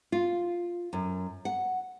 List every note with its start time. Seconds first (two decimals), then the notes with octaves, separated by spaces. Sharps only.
0.12 F4
0.93 F#2
1.45 F#5